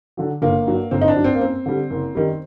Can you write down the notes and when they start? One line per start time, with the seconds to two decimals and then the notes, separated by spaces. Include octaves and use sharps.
0.17 D3 F#3
0.42 G1 A#3
0.67 G2 F#3
0.91 G1 C4
1.01 D#4
1.08 D4
1.16 G2 F#3
1.24 C4
1.35 A#3
1.41 F#2 C4
1.66 D3 G3
1.90 F#1
2.15 F#2 D#3 G3